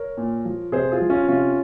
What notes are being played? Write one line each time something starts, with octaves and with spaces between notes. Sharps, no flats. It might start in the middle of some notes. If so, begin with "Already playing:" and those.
Already playing: A#4 C#5
A#2
F3
C3 G#4 C5
F4 G#4
F3
C#4 F4
C3 C#4 F4